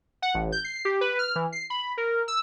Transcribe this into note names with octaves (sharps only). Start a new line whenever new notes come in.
F#5
A1
G6
C7
G4
B4
F6
E3
C7
B5
A#4
E6